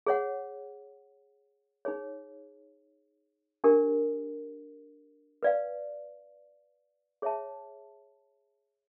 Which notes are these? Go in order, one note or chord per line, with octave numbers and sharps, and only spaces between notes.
G#4 C#5 F#5
D#4 G#4 C#5
D4 G4 A#4
B4 D5 F5
G#4 C#5 E5 A5